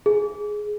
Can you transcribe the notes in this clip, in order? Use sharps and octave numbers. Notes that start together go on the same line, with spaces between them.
G#4